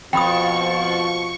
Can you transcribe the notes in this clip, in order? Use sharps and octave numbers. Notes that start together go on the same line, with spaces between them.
F2 B2 F3 G5 B5 C#6 D#6